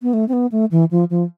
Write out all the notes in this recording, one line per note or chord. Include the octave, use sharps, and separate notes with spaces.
B3
A3
C4
B3
A3
E3
F3
F3